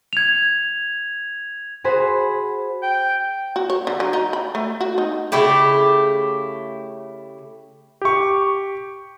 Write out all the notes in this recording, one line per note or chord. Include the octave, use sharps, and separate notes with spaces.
G#6 F7
F#4 G#4 C5 B5
G5
F#4
C#5
D3
F#3
D#4
B5
A3
F#4
D#4
C#3 A3 E4 G4
G4 C#6